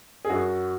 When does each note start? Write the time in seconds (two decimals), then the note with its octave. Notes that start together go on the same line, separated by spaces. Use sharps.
0.25 G#4
0.30 F#2 F#4